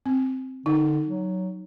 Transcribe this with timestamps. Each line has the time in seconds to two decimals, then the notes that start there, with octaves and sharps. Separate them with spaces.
0.06 C4
0.66 D3 D#4
1.06 F#3